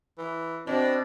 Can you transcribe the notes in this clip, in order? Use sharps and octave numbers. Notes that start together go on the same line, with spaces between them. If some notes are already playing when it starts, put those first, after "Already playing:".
E3
B2 C4 D4